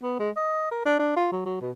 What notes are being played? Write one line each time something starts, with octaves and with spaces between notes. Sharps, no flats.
B3
G#3
D#5
A#4
D4
D4
F4
F#3
F#3
B2